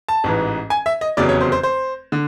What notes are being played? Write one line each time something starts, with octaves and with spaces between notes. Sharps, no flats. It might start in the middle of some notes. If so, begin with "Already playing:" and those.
A5
A1 G#2 E3
G#5
E5
D#5
F1 E2 C#3 F#3 D5
C#5
C5
C5
C5
D3